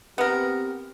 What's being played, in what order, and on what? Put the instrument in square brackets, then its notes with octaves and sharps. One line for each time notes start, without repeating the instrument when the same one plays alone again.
[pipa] B3 A#4 [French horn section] C4 G4